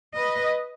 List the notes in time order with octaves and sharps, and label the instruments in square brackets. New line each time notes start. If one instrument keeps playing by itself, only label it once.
[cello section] B4 D#5